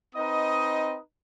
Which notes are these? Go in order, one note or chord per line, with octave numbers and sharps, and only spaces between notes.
C4 D#4 B4 D#5 D#6